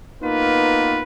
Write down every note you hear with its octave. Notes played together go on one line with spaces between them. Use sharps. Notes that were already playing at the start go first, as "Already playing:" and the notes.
A#3 B3 D#4 F4 B4